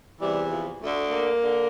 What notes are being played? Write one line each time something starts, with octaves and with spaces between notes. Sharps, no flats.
E2 C3 E3 G3
F3
D2 D3 A3
A#3
D3